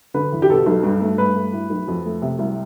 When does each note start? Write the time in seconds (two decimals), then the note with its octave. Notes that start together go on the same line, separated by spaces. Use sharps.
0.14 D3 B4
0.33 E2
0.42 G4
0.50 B2 A4
0.66 B1
0.83 G2
1.01 A3
1.18 G2 B4
1.35 A3
1.53 A2
1.70 B1
1.88 F2
2.05 A3
2.22 C3
2.39 C2